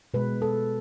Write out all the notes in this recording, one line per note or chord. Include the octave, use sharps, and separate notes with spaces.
B2 G#3 B4
A4